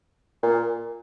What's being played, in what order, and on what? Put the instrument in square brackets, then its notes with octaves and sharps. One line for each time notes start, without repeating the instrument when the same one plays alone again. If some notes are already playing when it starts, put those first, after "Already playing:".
[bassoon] A#2